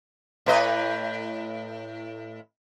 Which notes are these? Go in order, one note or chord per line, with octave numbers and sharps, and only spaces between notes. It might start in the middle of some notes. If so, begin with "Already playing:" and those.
A2 B4 D#5